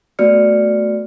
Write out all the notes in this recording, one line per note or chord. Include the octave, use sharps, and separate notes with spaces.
A3 B3 F#4 D5 F6 C#7